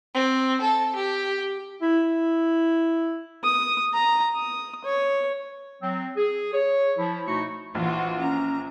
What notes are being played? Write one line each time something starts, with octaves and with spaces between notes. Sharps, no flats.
C4
A4
G4
E4
D#6
A#5
D#6
C#5
F#3 C4
G#4
C#5
F3 E4
B2 A3 D#4 E4 F#4 C#6
A#1 E3 F4 F#4
C#4 A#5